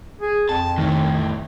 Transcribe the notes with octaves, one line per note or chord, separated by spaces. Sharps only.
G#4
F2 A5
C2 A2 D#3